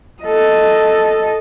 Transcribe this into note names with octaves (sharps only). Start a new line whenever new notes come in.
A4 D#5